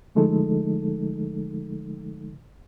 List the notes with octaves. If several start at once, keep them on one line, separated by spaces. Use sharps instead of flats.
D3 F3 G#3 A3 D#4 A4